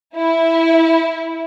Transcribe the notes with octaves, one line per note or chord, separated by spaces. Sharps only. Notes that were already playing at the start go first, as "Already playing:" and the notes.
E4